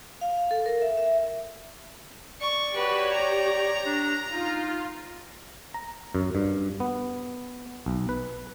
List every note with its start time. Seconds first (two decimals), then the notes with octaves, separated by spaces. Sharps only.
0.21 F5
0.38 F5
0.51 A4
0.66 A#4
0.82 E5
0.97 E5
2.41 D5 C#6
2.76 F#4 G4 B4 C#5
3.13 A#5
3.86 D4
4.32 D#4 F4
5.74 A#5
6.15 F#2
6.35 G2
6.80 B3
7.86 B1
8.09 B4